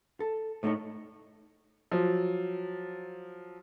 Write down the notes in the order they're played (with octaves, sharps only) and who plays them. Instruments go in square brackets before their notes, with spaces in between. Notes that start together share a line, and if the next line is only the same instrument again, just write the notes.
[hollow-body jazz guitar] A4
A2 A3 D#4 A4 C#5
[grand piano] F3 F#3